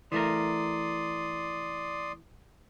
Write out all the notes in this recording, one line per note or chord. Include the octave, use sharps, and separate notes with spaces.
E3 A3 A#4 D5 C6 D#6